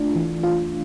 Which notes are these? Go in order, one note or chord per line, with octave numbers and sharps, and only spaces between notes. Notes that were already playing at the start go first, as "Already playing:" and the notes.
Already playing: A3 D4 F4
E3
F4